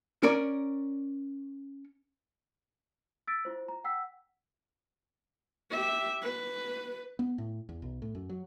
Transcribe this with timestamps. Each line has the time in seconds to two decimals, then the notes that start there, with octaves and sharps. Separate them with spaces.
0.23 C#4 A#4 D5
3.27 E6 A6 B6 D7
3.45 E4 F4 C5
3.68 A#5
3.84 F#5 G5 E6 B6
5.71 G4 E5
6.23 B4
7.19 B3
7.38 A2
7.69 E2
7.82 B1
8.02 A2
8.15 F#2
8.29 F#3